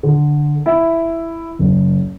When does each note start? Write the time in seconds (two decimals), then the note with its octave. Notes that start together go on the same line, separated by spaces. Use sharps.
0.03 D3
0.66 E4
1.59 F#1